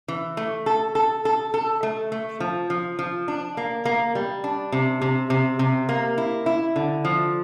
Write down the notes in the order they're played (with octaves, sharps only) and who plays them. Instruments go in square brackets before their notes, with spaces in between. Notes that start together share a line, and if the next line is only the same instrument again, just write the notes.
[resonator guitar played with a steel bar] E3
A3
A4
A4
A4
A4
A3
A3
F3
F3
F3
D4
A#3
A#3
G3
D4
C3
C3
C3
C3
A#3
E4
E4
D3
F3